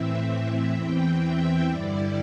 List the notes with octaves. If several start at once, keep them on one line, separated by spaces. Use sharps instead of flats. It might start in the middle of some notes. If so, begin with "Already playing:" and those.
Already playing: A2 E3 C4 E5
E2 E3 C4 G5
E5
G2 D3 G3 E4 D5